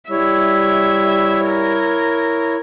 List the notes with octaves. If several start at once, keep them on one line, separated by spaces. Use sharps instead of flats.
G3 E4 C#5 E5
A#4